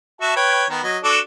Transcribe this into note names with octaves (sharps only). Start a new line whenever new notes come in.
F#4 E5 A5
B4 C#5 G5
D#3 B3
F#3 D#5
D4 F#4 A4